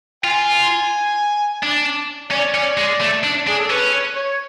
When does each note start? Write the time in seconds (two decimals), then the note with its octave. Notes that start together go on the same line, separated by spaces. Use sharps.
0.24 F4 G#5
1.63 D4
2.31 C#4 D5
2.54 C#4
2.78 G#3
3.01 A3
3.24 D4
3.47 D4 G#4
3.59 A4
3.70 C#4 B4
4.16 C#5